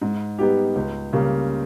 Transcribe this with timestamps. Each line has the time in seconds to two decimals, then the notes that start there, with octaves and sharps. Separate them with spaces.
0.01 G#2
0.39 G3 B3 D#4 G4
0.76 C#2
1.13 C#3 G3 A#3